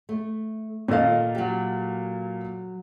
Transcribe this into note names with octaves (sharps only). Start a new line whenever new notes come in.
A3
A#2 D#3 A4 D#5 F5
F#3 G4